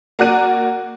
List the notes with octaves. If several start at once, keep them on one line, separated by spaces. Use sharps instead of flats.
A#3 F#4 D5 F#6 D#7